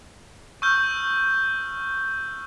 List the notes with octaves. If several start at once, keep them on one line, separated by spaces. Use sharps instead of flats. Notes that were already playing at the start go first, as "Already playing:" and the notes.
C#6 E6 F6 G6